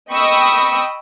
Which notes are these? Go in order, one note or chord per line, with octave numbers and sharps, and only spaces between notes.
D#5 G5 B5 C#6 D#6 E6